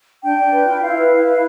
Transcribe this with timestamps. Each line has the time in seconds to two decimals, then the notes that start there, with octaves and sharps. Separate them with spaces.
0.23 D4 G5
0.38 D4
0.52 B4
0.67 F4
0.82 E4 F5
0.97 B4
1.12 E4
1.26 B4